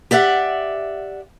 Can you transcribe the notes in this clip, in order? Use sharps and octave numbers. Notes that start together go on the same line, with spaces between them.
G4 D5 E5 F#5